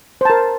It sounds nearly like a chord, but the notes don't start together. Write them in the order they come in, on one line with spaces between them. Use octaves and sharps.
C5 A5 A#4